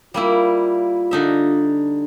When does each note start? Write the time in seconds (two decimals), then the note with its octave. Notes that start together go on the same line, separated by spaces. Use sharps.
0.14 G3 A#3 E4 F4
1.11 D3 D#4 E5